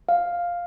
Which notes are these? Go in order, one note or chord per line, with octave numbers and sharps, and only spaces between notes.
F5